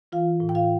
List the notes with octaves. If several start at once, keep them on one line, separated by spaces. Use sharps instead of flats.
E3 F4 F5
A2
G5
F4 F5